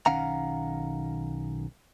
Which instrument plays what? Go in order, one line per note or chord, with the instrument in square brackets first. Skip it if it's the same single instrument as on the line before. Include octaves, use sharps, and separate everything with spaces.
[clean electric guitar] B1 D#3 C#4 F5 F#5 A#5